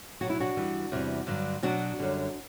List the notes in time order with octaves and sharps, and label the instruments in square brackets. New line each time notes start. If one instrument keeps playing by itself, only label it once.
[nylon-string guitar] B2 F#3 F#4
E4
D4 F#4
G2 E3 G3
E2 C3 G3
G2 D3 F#3
B2 F#3 D4 F#4
F#2 D3 G3